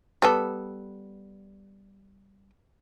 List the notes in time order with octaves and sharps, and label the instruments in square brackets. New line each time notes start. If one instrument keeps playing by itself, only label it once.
[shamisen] G3 B3 A4